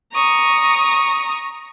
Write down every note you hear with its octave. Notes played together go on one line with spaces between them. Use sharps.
A#5 C#6 D#6